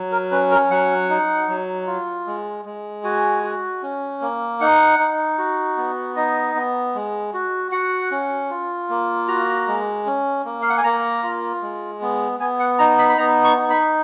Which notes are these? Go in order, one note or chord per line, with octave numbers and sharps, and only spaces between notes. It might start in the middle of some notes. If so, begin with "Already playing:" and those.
Already playing: F#3
A#4
C#4 B4
A#4
F#3 F#5
D#4
F#3
F4
G#3
G#3
F#4 G#5
F#4
C#4
A#3
D#4 F#5
D#4
F#4
B3
D#4 D#5
B3
G#3
F#4
F#4 F#5
C#4
F4
A#3
F#4 A#5
G#3
C#4
A#3
F5
F#5
G#5
A#3 A#5
F4
G#3
B3
B3 G#5
F#5
D#4 A#5
B5
B5
B3 A#5
C#6
D#4
B5